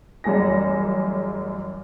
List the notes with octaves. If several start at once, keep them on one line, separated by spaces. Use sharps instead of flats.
A1 F#2 G3 G#4 A#6